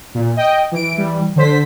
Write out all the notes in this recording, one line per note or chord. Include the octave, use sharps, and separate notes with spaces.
A#2
D#5 G5
E3 D7
E3 G3
D3 C5 B6